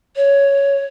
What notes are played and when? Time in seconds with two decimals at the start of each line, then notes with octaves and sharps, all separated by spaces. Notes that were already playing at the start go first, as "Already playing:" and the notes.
0.16 C#5